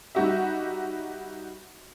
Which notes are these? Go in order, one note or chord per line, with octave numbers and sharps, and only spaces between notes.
G3 D#4 F#4 G4 E5